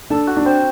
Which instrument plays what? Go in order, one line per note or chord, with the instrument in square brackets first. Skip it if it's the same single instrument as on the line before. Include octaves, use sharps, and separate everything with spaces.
[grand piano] D4 [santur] A4
[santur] F#4
[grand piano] D4
[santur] C4